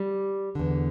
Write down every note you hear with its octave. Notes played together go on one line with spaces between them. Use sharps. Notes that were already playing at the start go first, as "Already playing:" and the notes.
Already playing: G3
E2 D3